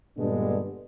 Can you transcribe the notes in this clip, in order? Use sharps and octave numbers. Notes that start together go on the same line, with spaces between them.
G2 A#2 D3 G#3 B3 D4